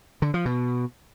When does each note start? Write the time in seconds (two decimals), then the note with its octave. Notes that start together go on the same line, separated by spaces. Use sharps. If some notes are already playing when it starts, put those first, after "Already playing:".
0.22 D3
0.34 F3
0.45 B2